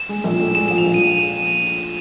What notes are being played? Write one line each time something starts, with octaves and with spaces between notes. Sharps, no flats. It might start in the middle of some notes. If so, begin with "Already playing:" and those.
Already playing: E7
G#3
A#1
A2
G#3 E7
F3 E7
F7
A#1
D#7